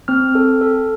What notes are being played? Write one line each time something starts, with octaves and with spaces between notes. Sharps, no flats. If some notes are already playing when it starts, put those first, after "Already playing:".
C4 F6
A4
A4